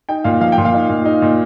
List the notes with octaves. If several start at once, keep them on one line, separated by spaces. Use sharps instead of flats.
D#4 G5
A#2 F5
F3 F5
G5
A#2
F5
D#4
A#2
D#4
A#2